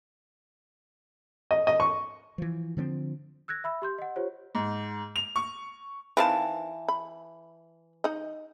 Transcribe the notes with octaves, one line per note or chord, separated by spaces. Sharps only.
D#5
D#5
C#6
E3 F3
D3 F3 B3 C4
E6 F#6 G#6 A#6
E5 B5 E6
G4 C6 G6
D#5 F#5
F4 G4 C5 C#5
G#2
F7
C#6
D#3 E3 C4 B4 F5 A5
B5
D#4 D#5